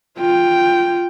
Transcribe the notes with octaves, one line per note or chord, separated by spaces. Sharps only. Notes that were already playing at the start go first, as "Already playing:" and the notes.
F4 G5